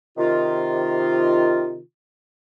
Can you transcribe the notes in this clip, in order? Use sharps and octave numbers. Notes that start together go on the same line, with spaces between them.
C3 D#3 F4